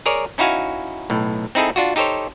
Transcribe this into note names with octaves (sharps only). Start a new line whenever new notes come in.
G#4 A#4 C#5 D5
C#4 D#4 E4 F#4 F5 G#5
B1 A2
C4 D#4 E4 G#4 A4
D4 F4 F#4
D#4 G4 A4 C5 C#5